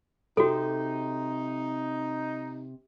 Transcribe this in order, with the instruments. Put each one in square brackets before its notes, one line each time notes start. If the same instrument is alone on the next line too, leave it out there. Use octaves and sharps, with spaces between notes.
[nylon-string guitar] C3 [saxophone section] D#4 [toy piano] F#4 A4